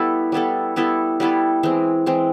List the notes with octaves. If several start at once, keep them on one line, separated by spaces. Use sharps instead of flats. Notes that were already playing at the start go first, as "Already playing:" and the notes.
Already playing: G3 B3 E4 A4
G3 B3 E4 A4
G3 B3 E4 A4
G3 B3 E4 A4
E3 G#3 C4
E3 G#3 C4